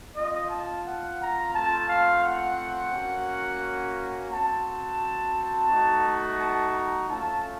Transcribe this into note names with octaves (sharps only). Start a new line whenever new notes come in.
C4 F4 D#5
A5
F#5
A#5
A3 C4 F4 A5
F5
F#5
A#3 C#4 F#4
C4 F#4 A5
A3 D#4 F#4
A5
A#5
A3 C#4 F4 A5